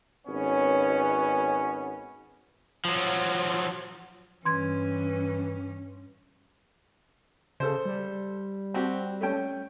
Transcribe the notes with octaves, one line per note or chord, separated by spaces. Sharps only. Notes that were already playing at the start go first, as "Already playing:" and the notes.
G#1 B2 B3 C#4
F3 F#3
G2 E3 C#4 C6 G#6
C#3 A4 C5
G3
C4 F#4 G4
A3 C#4 G5